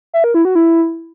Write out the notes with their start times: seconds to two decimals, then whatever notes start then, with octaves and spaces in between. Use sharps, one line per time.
0.14 E5
0.24 A#4
0.34 E4
0.45 F#4
0.55 E4